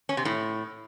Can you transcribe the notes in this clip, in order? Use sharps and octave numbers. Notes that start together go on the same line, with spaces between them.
C#4
C3
A2